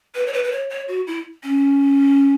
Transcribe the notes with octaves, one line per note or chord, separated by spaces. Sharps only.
B4
C#5
B4
B4
C#5
C#5
F#4
E4
C#4